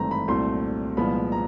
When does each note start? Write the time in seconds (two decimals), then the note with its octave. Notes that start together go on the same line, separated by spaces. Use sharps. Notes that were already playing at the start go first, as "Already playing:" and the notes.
Already playing: G#1 G2 E3 A3 C4 A#5
0.11 B5
0.28 C2 A#2 F#3 A3 C4 C6
0.97 C2 A#2 F3 G#3 B3 B5
1.32 A#5